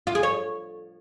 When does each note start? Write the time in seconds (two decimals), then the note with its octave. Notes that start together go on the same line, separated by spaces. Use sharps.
0.07 F4
0.15 G#4
0.23 C#5